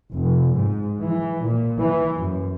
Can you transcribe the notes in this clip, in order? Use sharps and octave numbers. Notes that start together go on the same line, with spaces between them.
F1
G#2
E3
A#2
E3
F#2